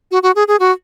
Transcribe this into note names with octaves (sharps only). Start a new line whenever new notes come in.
F#4
F#4
G#4
G#4
F#4